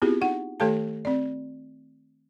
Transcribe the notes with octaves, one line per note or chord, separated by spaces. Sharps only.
B3 C4 E4 F4 G4 G#4
D#4 F#5
D#3 A3 G4 A4 F5 A5
C4 D5